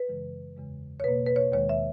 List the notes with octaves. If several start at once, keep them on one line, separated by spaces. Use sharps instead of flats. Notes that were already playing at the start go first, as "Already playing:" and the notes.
Already playing: B4
F#2 C#3 E3 G#3
E2 C#3 G#3
C#5
B2 A#3 B4
B4
C#5
D#2 D#3 G#3 C#5
E5